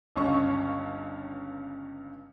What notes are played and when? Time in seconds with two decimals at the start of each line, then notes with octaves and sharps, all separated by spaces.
0.16 G1 C#2 G2 C#4 C#6